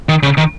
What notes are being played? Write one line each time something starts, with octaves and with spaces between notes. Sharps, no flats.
D#3
C#3
D#3